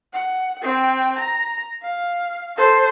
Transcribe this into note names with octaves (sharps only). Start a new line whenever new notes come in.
F#5
C4 G5
A#5
F5
A4 C5